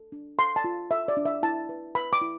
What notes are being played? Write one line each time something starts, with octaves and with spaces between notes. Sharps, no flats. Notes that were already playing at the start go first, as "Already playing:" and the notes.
Already playing: A4
D4
A4 C6
A5
F4
A4 E5
D5
D4
E5
E4 A5
B4
B4 B5
D6
E4